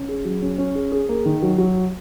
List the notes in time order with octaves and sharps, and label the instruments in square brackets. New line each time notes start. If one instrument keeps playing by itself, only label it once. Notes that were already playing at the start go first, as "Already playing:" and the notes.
Already playing: [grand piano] C#4
G#4
F#3
C#4
C#4
G#4
G#4
A#3
D#3
F#3
F#3